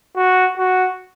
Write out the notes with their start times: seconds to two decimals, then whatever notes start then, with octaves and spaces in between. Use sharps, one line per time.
0.16 F#4
0.58 F#4